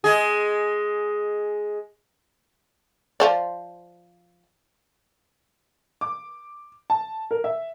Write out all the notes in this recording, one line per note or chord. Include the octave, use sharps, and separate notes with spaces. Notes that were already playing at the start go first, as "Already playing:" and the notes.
G#3 G#4
F3 C5 D5
D6
A5
A#4
E5